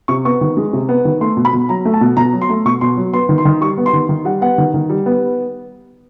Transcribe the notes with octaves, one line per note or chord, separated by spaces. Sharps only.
C3 C#6
B3 C#6
D#3
G#3
C3
B3
D#3
A3 C6
B2
B5
B2
F#3 A#5
A3
A5
B2
B2 A#5
F#3
C6
A3
B2 C#6
B2 C6
F#3
B3 C6
D#3
C6
D#3
G3 C#6
B3
C6
D#3
D#3
G3 F#5
B3 F#5
D#3
D#3
G3
B3